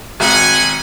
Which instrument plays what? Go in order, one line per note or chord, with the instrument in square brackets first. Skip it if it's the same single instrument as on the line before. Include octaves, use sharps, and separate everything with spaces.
[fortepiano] G#1 [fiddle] F#5 [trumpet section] G#5